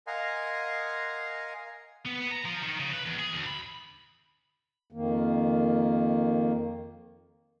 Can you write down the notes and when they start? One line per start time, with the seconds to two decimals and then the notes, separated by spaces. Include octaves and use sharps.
0.07 A#4 D#5 F5 F#5 G#5 C6
2.05 B3
2.20 B3
2.31 A#5
2.45 F3
2.63 D#3
2.80 C#3
2.94 B4
3.06 E2
3.19 G#4
3.33 D2
3.46 B5
4.92 F2 D#3 A#3